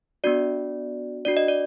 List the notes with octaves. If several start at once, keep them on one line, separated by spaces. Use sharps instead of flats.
B3 D4 F#4 D5
D4 F#4 D5
D#5
D5